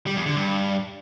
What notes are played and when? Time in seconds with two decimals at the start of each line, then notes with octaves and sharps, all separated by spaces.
0.07 G3
0.16 E2
0.26 D3
0.36 G2